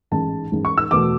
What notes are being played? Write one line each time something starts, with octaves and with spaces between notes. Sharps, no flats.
A1 G#2 G#3 A5
A1 G#2 G#3
C#6
E6
E2 B2 A3 D6